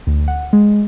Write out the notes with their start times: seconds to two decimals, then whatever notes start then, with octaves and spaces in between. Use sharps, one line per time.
0.07 D2
0.28 F#5
0.53 G#3